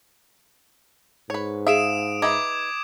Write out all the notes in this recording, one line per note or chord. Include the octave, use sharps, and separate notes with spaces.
G#2 B4 C#5
G#4 E5 F5 D#6 D7 E7
D#4 B4 E5 D6 D#6 G#6